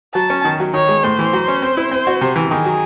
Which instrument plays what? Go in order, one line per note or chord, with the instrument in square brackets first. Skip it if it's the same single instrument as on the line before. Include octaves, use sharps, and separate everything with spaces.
[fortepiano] F#3 [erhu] A5
[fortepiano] C#4
D#3
F#3
[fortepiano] D#3 [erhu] C#5
[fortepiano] G#3
[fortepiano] A2 [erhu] C5
[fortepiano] E3
F#3
C#4
C4
E4
[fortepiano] C4 [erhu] C5
[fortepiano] F#4
C3
E3
[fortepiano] D#3 [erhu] G#4
[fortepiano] F#3